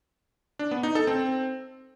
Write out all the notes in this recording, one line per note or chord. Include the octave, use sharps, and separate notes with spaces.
D4
B3
D#4
A4
C4